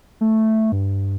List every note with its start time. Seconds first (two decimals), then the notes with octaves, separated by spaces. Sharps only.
0.21 A3
0.72 G2